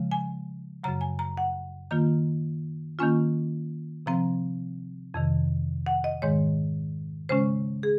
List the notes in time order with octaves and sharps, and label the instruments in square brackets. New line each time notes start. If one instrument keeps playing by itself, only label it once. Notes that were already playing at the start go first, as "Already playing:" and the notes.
Already playing: [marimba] C#3 F3 G#3
G#5
F#2 C#3 F#3 A#5
G#5
A#5
F#5
D#3 A#3 F4 A#5
D#3 A#3 C#4 F4 G#5
C3 F3 C4 A#5
F2 C3 D#3
F#5
D#5
G#2 D#3 G#3 C#5
C#3 G#3 C#4 C5
G#4